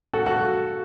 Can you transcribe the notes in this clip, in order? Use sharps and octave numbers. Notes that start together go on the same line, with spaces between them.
F#4 A4
F#4 A4